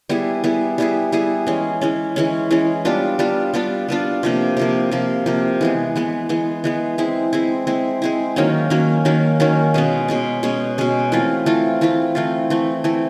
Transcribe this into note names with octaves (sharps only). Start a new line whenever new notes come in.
G3 B3 E4 G#4
G3 B3 E4 G#4
G3 B3 E4 G#4
G3 B3 E4 G#4
E3 G#3 C#4
E3 G#3 C#4
E3 G#3 C#4
E3 G#3 C#4
G3 B3 D4 F4
G3 B3 D4 F4
G3 B3 D4 F4
G3 B3 D4 F4
C3 F3 A#3
C3 F3 A#3
C3 F3 A#3
C3 F3 A#3
E3 G#3 B3
E3 G#3 B3
E3 G#3 B3
E3 G#3 B3
G#3 C4 E4
G#3 C4 E4
G#3 C4 E4
G#3 C4 E4
D#3 F#3 A#3 C#4
D#3 F#3 A#3 C#4
D#3 F#3 A#3 C#4
D#3 F#3 A#3 C#4
B2 G#3 C#4
B2 G#3 C#4
B2 G#3 C#4
B2 G#3 C#4
E3 A3 C4 F4
E3 A3 C4 F4
E3 A3 C4 F4
E3 A3 C4 F4
E3 A3 C4
E3 A3 C4